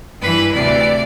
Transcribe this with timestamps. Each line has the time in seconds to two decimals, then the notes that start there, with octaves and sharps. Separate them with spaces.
0.21 G2 E3 B4
0.54 D2 C3 E3 D5